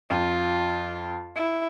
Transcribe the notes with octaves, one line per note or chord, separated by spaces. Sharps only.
F2 F4
E4